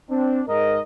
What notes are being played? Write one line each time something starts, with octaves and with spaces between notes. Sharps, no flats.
C4 D4
G#2 A#4 D#5